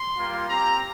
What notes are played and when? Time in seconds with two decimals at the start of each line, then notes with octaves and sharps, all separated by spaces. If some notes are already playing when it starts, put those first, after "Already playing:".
Already playing: C6
0.16 G3 A#3 F4
0.48 C4 G4 A#5